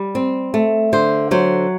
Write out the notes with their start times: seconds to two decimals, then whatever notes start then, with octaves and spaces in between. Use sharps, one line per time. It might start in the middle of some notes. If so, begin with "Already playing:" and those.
Already playing: G3
0.15 C4
0.54 A3
0.93 D3 C5
1.31 F#3 C5